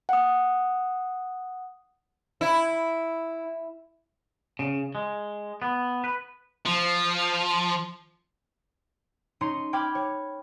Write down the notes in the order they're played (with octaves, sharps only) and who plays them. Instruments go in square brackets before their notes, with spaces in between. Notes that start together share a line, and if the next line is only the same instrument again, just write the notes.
[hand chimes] F#5 D#6
[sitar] E4
[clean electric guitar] C#3
G#3
B3
B4
[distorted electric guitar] F3
[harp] C#4 D#4 C6 C#7 D#7
G5 B5 D6 F6 G#6
C#5